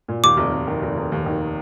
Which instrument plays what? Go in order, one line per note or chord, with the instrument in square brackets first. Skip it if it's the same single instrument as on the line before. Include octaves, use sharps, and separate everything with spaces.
[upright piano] A#2
[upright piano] D#2 [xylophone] D6
[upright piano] F1
F1
D#3
F1
F1
D#2
D#3